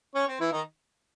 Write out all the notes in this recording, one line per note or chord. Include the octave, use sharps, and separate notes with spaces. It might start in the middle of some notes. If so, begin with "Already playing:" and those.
C#4 C#5
C4 C5
E3 E4
D#3 D#4